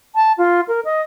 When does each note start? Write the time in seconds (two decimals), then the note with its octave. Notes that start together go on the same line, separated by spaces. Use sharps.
0.15 A5
0.38 F4
0.68 A#4
0.85 D#5